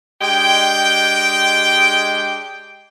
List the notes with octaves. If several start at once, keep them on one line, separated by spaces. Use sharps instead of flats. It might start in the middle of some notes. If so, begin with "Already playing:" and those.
G#3 D4 G4 D#5 G5